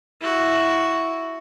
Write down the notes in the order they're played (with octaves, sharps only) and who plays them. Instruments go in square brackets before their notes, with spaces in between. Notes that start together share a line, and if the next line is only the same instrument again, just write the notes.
[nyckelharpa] E4 F#4